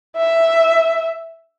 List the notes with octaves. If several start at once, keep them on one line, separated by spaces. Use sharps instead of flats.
E5